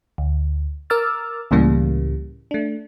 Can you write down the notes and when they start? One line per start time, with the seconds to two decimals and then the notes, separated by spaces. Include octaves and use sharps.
0.18 D2
0.90 A#4 D6 E6 F6 A6
1.51 C#2 A2 C#3 E3 G3 A#3
2.51 A3 D4